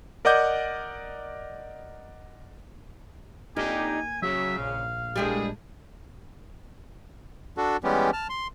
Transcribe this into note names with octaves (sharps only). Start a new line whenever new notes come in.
A#4 D5 D#5 F#5 D6 G6
F2 A#3 D4 D#4 G4 G#5
C#3 F#3 E5
A#1 F5
A2 G3 G#3 A#3 D4 G#4
D4 F#4 A4
E3 G3 G#3 B3 C#4 G4
A5 F6
C6